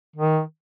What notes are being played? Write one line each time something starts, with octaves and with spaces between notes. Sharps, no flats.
D#3